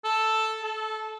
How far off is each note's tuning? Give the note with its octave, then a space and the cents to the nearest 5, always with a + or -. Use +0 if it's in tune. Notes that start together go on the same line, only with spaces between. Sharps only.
A4 +0
A4 -20